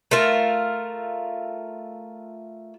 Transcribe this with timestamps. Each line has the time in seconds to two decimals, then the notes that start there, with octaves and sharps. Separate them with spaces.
0.11 A3 F4 A#4